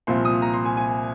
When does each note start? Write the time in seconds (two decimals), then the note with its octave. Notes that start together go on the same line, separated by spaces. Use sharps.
0.07 C2 A#2 F3 C4 C6
0.25 D#6
0.42 A#5
0.54 C6
0.65 G#5
0.77 G#5